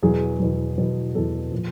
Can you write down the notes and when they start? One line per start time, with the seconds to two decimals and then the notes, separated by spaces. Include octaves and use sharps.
0.03 E2 B2 F#3 G#4
0.39 E2 B2 F#3
0.78 E2 B2 F#3
1.15 E2 B2 F#3 A4
1.52 A#2 F3